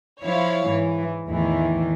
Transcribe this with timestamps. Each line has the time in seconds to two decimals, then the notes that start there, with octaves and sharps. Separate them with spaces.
0.21 F3 E4 C#5 F5
0.67 G#2 E3
1.27 E2 A2 D#3 E3